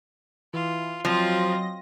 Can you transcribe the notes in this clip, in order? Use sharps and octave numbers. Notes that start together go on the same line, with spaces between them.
E3 F4
F3 F#3 C4 F4 D#5 A#6